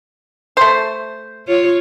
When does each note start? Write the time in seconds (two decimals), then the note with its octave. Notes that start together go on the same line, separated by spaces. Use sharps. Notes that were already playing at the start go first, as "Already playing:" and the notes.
0.57 A3 C5
1.47 F4 C#5